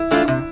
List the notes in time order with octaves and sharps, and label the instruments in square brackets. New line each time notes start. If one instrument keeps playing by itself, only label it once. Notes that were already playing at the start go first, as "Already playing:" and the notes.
Already playing: [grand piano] E4
[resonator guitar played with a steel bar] E3 A3 D4 F4
C3